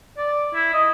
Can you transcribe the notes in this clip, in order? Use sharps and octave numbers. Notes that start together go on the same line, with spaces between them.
D5
E4
D#5